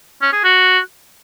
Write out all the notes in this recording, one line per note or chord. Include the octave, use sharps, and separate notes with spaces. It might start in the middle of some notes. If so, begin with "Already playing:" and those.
C#4
G#4
F#4